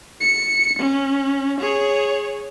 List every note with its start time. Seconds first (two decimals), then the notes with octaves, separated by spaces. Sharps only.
0.21 C#7
0.79 C#4
1.60 G#4 C#5